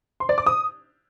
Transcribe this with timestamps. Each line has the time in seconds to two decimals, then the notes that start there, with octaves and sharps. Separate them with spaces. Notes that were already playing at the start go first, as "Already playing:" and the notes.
0.20 C6
0.29 D5
0.38 D6
0.46 D#6